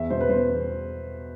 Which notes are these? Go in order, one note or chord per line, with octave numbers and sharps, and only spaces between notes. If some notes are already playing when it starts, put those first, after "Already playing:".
Already playing: E2 E5
B2 C5
B4
B2 C5
E2